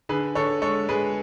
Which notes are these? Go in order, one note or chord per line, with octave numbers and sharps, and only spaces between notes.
D3 G#4 B4
D3 A4 C#5
G#3 A4 C#5
G#3 G#4 B4